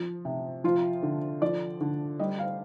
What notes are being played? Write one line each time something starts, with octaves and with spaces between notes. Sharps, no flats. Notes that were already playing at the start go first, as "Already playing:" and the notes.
Already playing: F3
C3
F3 F4
D3
F3 D5
D3
G3 D#5
F5